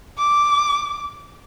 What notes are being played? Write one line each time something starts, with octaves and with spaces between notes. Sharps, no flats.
D6